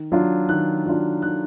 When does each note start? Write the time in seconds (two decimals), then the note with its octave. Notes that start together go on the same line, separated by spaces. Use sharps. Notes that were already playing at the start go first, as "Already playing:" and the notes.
Already playing: D#3
0.12 F#3 D4 F4
0.49 D#3 F#6
0.86 F#3 D4 F4
1.22 D#3 F#6